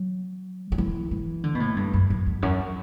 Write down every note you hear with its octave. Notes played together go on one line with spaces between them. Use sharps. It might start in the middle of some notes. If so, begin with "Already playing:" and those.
Already playing: F#3
F#3
E3
E3
D3
B2
A2
G2
F#2
F#2
E2
F#2